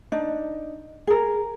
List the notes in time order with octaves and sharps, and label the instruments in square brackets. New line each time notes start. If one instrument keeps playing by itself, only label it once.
[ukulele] D4 D#4
G#4 A#4